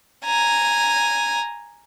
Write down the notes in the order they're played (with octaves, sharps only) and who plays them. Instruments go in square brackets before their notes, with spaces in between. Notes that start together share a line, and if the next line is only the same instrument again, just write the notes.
[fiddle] G#5 A#5